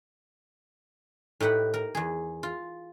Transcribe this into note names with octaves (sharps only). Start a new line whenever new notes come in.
A2 D#4 G4 B4 F#5
A#4
E2 G#4
F4